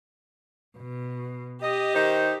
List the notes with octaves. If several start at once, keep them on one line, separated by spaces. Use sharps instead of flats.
B2
G4 D#5
D#3 D#4 C5